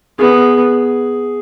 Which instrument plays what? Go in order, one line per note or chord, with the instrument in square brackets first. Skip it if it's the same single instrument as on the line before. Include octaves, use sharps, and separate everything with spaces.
[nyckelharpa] B3 [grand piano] G#4